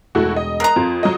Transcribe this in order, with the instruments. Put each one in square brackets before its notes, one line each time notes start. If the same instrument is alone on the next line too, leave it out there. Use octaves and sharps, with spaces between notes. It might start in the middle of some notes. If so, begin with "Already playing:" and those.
[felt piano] E1 [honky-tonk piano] A3 E4 F#4
[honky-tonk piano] D#5
[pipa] A#4 A#5 [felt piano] F#6 A#6 C7
[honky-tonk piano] F2 [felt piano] F4
[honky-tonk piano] F#3 D#5